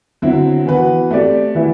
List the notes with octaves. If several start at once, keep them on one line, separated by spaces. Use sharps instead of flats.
D3 F#3 C4 E4
E3 B3 F#4 B4
A3 C4 G4 D5
E3 B3 E4